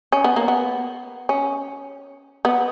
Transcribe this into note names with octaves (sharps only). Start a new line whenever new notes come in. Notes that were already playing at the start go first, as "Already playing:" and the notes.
C#4
B3
A#3
B3
C#4
B3